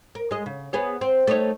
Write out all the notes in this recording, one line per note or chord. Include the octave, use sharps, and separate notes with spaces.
A#4
G#3 D#5
C#3
B3 G#4 C#5
C4
A3 D#4 C#5